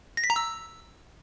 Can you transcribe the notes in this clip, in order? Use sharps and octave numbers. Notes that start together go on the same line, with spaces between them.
A#6
B6
A#5
E6